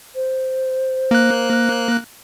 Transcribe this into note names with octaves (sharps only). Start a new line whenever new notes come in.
C5
A#3 F#6